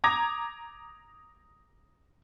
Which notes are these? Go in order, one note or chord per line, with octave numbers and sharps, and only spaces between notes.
A#5 D6 D#6 G#6 A#6